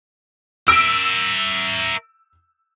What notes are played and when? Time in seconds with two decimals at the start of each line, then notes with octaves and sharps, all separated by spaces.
0.68 A#4 E5 E6 D7